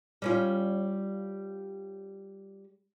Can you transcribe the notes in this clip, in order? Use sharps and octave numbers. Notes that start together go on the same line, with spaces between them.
G3 C#4 F4